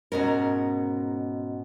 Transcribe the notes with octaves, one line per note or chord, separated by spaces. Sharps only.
G#2 B2 C#4 A#4